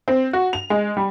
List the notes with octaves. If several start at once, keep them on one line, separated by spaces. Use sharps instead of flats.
C4
F#4
F7
G#3
G3